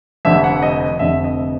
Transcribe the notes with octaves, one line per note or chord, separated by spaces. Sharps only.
F1 F2 D3 E5
F#5
D#5
D#5
F1 F2 D3 E5
D#5